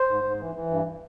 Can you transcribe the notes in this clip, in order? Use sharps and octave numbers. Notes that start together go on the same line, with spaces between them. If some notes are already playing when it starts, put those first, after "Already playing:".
Already playing: C5
G#2
G#2
E3
E3
G2